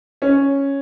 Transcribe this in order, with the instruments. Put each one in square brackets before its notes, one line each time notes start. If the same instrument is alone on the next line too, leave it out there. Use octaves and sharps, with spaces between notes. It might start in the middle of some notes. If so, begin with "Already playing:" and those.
[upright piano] C#4